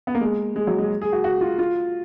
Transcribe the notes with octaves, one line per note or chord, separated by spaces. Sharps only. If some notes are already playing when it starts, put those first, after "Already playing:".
B3
A#3
G#3
G#3
F#3
G#3
G#4
F#4
F#4
F4
F4